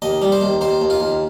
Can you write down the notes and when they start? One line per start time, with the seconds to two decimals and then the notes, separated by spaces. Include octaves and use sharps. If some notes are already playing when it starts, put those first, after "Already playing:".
0.02 D#2 D#5
0.22 G3
0.32 C5
0.41 D#2
0.61 D#2 C5
0.81 D#2
0.90 F4
1.00 D#2